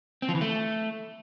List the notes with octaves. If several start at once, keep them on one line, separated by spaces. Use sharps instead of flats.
C4
F3
E3
A3